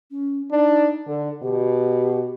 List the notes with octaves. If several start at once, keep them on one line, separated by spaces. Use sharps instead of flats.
C#4
D4 D#4
D3 A4
B2 G4